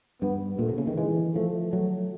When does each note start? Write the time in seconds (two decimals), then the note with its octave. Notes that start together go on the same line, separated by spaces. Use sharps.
0.22 G2 B3
0.59 A#2 A3
0.69 C3
0.78 C#3
0.87 D#3
0.97 E3 G#3
1.35 F3 A3
1.73 F#3 A3